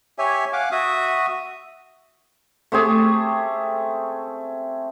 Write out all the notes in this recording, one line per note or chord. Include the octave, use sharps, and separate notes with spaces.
G4 C#5 E5 G#5
F5 F#5 G#5 D6
F#4 E5 D#6
A3 C4 G4 G#4